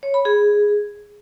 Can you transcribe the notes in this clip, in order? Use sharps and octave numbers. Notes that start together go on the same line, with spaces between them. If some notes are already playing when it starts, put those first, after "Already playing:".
C#5
B5
G#4